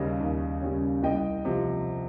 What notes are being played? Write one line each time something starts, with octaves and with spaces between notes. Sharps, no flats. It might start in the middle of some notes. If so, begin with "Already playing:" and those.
Already playing: D#2 C#3 G3 C#4 D#5
D#2
C#3 G3 C#4
C2 D#5 G5
C3 F3